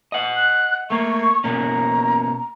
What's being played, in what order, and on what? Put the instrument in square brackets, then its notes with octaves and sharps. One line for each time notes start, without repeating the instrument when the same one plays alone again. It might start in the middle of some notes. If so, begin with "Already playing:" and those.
[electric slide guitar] D#5 F#5
[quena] F#6
[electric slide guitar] A3 A#3 [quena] C#6
[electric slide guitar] B2 A#3 C#4 [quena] A#5